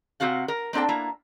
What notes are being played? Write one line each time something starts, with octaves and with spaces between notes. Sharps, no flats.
C3 C4 F#4 F5 F#5
A#4
A#3 C4 D4 A4 G5
A#3 E4 A#5